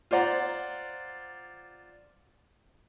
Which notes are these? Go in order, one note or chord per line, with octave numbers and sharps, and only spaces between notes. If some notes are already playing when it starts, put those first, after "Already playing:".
F4 C5 D5 F#5 A#5